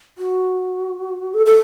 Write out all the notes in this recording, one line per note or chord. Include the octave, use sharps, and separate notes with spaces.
F#4
A4
A4